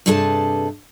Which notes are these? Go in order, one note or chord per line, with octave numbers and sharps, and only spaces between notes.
G2 C3 G#4 A4 B4 A5